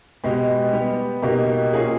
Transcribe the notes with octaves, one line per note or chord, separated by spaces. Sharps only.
B2 G#3 B3 G4
G3 B3 G4
B2 A#3 D#4 G4
A#2 A#3 C#4 G#4